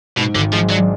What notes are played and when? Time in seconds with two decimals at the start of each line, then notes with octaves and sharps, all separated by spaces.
0.17 G#2 B2
0.35 G#1 D3
0.53 F3 G#3
0.70 F#3 D4